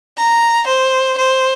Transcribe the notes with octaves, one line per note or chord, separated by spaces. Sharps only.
A#5
C5
C5